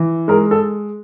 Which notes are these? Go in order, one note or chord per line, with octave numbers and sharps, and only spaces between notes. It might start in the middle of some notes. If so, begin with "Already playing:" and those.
Already playing: E3
G#3 A#4
A4